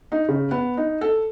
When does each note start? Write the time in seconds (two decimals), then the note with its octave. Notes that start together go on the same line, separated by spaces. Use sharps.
0.12 D#4
0.28 C#3
0.51 B3
0.77 D#4
1.01 A4